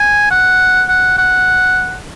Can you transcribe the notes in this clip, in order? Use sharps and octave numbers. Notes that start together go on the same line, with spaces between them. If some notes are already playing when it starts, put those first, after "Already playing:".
Already playing: G#5
F#5
F#5
F#5